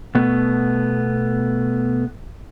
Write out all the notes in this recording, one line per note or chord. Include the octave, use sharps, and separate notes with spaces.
B2 A3 B3